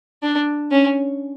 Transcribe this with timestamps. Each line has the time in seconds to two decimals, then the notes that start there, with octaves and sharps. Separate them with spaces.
0.23 D4
0.71 C#4